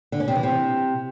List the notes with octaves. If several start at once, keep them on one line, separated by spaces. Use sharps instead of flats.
D3
C#4
C3
E3
C3